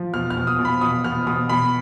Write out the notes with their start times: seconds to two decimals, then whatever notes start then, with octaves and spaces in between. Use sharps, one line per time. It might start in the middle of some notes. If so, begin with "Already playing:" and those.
Already playing: F3
0.14 B2 F6
0.30 F6
0.37 B2
0.47 D#6
0.59 B2
0.65 B5
0.81 B2 D#6
1.04 B2 F6
1.27 B2 D#6
1.49 B2 B5